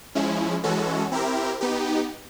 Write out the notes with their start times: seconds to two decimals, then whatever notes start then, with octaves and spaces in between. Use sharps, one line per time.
0.15 F3 G#3 C#4 E4
0.63 E3 G#3 C#4 F#4 A4
1.12 C4 E4 G4 A#4
1.61 B3 D#4 G4